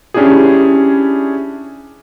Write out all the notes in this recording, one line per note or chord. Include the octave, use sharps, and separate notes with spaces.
C#4 D4 E4 G4 G#4